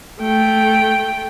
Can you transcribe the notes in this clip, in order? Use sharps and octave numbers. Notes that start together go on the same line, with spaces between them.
A3 G5